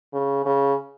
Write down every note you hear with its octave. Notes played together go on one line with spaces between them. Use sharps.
C#3
C#3